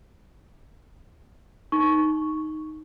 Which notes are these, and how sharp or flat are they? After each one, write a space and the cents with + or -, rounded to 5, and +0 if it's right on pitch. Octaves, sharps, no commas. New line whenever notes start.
D#4 +0 C#6 +0